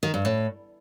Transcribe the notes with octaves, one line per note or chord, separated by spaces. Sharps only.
D#3
G2
A2